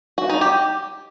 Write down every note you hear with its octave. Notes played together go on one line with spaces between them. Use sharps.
F#4
D#4
G4